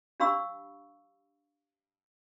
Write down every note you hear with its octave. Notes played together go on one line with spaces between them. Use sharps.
D4 G4 F5 B5 C#6 E6